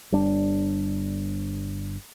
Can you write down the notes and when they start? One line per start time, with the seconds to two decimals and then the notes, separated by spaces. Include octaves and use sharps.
0.12 G1 G3 D4